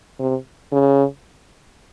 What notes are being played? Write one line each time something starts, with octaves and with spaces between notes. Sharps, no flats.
C3
C#3